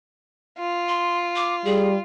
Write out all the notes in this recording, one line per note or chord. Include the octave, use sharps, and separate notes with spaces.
F4
C6
D6
G3 G#4